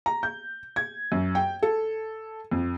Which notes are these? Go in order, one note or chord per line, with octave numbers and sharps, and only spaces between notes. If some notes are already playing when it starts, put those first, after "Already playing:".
A#5
G6
G#6
F#2
G5
A4
F2